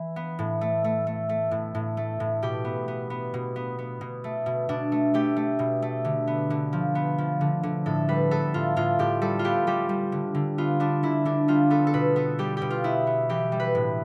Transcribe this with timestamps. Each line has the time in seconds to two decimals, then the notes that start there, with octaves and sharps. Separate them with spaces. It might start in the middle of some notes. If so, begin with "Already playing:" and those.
Already playing: E3
0.16 B3
0.39 A2
0.61 A3
0.84 A3
1.07 A3
1.29 A3
1.51 A2
1.75 A2
1.97 A3
2.20 A2
2.42 B2 G4
2.65 B3
2.88 B3
3.10 B3
3.34 B2
3.56 B3
3.79 B3
4.01 B2
4.24 A3
4.46 B2
4.69 B2 D4
4.92 A3
5.14 A3 G4
5.36 A3
5.59 B2
5.82 A3
6.05 D3
6.27 B3
6.50 D3
6.73 F3
6.95 B3
7.18 F3
7.41 D3
7.63 D3
7.86 A2 A4
8.08 G3 B4
8.31 B3 A4
8.54 A2 F4
8.76 A2 F4
8.99 A2 G4
9.22 G3 A4
9.39 F4
9.44 B3 G4
9.67 G3 G4
9.89 G3
10.12 D3
10.35 D3
10.58 B3 F4
10.80 B3 D4
11.03 D3 E4
11.25 D3 D4
11.48 G3 F4
11.70 B3 A4
11.87 A4
11.94 B2 B4
12.16 B3 A4
12.39 G3 G4
12.57 B2 G4
12.70 F4
12.84 B3 E4
13.07 B3
13.29 E3 G4
13.52 G3
13.60 B4
13.75 A2